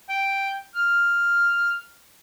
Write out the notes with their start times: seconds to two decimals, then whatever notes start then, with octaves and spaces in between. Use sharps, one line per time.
0.10 G5
0.76 F6